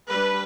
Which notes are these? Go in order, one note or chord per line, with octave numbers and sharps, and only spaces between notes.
G3 D4 B4